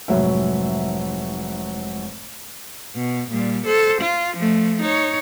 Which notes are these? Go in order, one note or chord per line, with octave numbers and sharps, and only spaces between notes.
F1 G#2 F#3 C#5 E5
B2
A#2 G3
A4 C5
F4
F3 A3
D#4 C#5